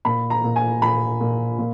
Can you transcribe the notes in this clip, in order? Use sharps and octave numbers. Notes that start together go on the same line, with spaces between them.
A#2 B5
A#5
A#2
G#5
A#2 B5
A#2
A#2